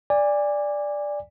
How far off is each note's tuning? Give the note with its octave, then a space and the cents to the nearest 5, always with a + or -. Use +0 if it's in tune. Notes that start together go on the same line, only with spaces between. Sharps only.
D5 +0 G#5 -30